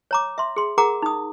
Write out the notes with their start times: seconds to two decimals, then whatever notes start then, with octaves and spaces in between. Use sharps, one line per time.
0.11 C#5 A#5 D6
0.38 E5 C6
0.56 G#4 C6
0.78 G#4 A#4 F#5 A#5 D6
1.02 D#4 D#6